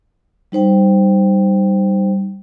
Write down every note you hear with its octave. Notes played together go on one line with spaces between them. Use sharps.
G3 D#4 C5 G5